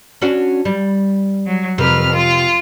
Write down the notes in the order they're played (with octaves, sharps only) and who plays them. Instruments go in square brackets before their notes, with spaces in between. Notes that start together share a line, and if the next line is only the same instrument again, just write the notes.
[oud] C#4 D4 F#4
G3
[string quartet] F#3
[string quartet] F2 B4 F6 [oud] C3 A#4
[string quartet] F4